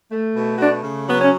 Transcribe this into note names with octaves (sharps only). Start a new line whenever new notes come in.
A3
B2
A3 D4 F#4
C#3
F#3 B3
C#4